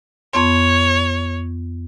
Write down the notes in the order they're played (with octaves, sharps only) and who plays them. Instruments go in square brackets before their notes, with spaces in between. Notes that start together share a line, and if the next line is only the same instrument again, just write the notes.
[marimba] F2 B3 C6 [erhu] C#5